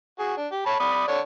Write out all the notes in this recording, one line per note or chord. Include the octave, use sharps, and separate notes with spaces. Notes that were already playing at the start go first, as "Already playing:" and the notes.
F#4 G#4
D4
G4
C#5 A5 B5
D5 B5 D#6
D3 D4 C#5